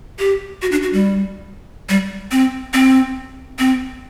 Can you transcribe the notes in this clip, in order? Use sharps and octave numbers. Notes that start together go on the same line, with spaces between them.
G4
F#4
D4
F#4
G3
G3
C4
C4
C4